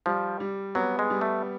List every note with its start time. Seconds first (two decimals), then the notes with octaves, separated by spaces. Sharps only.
0.06 F3 G3
0.40 G3
0.75 F#3 B3
0.99 G#3
1.10 G3
1.21 A3